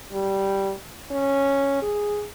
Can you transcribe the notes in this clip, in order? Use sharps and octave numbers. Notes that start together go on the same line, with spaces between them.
G3
C#4
G#4